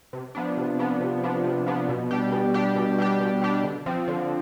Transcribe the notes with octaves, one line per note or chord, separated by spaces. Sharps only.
C3
F3 B3 D4
C3
F3 B3 D4
C3
F3 B3 D4
C3
F3 B3 D4
B2
G3 D4 G4
B2
G3 D4 G4
B2
G3 D4 G4
B2
G3 D4 G4
D3
F3 C4
D3